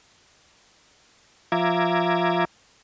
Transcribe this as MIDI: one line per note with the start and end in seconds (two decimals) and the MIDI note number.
1.52 2.45 53
1.52 2.45 65
1.52 2.45 76
1.52 2.45 82
1.52 2.45 86
1.52 2.45 92